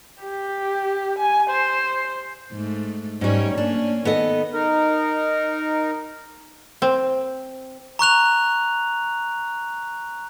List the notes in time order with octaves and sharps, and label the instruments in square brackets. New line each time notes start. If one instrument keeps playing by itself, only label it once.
[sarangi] G4
G#5
C5
[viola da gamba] G#2 A3
[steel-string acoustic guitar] G#2 G3 [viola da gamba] C#4 C#5
[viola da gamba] A#3 C#4 [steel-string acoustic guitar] D4
[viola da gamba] D#3 [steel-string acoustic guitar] B3 A4 D#5
[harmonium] D#4 A#4
[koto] C4
[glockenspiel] A#5 C#6 F#6 F7